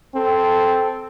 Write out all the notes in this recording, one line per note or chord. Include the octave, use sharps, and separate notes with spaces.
C4 A4